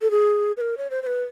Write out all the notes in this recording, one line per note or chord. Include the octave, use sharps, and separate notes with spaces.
A4
G#4
B4
A#4
C#5
C5
C5
B4